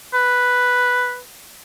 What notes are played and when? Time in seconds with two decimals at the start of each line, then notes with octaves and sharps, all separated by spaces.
0.14 B4